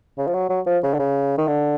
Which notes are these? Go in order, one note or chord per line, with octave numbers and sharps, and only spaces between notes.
C#3
F3
F#3
F#3
F3
C#3
D3
C#3
D#3
D3